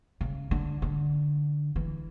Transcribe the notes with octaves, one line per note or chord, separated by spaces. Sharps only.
C#3
D3
D3
E3